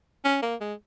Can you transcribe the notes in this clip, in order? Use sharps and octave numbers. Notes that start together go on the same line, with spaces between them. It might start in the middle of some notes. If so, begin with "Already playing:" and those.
C#4
A#3
G#3